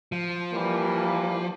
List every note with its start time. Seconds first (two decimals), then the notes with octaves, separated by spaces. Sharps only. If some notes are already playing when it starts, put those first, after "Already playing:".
0.12 F3
0.52 E3 G3 A#3